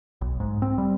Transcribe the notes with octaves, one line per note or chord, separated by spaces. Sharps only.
B1
G#2
C4
G3